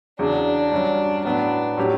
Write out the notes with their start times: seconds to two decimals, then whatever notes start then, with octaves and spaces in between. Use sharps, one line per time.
0.19 E2 C#3 F#3 D4
0.72 G2 F#3 C#4
1.24 A2 F#3 B3 D4
1.77 A2 F#3 C#4 G4